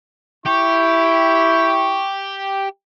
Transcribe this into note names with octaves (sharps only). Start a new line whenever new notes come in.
E4 G4 C#6